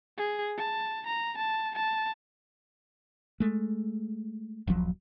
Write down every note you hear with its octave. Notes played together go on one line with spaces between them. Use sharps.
G#4
A5
A#5
A5
A5
G#3 A3
D#1 A#1 F3 F#3